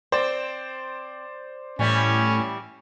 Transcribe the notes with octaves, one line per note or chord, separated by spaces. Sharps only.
C4 C5 D5
A2 E3 G3 C#4 E4